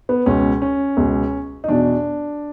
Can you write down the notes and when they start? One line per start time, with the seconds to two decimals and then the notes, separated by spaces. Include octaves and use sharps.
0.09 B3
0.26 C#2 B2 C#4
0.62 C#4
0.97 C#2 B2
1.64 D#4
1.68 E2 B2 D4